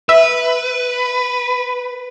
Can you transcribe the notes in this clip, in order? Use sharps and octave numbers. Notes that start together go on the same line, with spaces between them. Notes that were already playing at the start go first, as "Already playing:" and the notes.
B4 E5